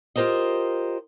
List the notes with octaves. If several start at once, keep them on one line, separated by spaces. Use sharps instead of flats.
F4 G4 A#4 C5 D#5